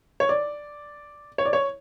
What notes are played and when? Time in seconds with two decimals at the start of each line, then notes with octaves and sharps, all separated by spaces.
0.20 C#5
0.29 D5
1.38 C#5
1.45 D5
1.53 C#5